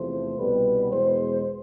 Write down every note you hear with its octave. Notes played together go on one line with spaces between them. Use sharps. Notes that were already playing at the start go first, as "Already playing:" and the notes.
Already playing: E2 C3 F3 A3 C5
C2 B2 G3 B3 B4
E2 B2 G#3 C5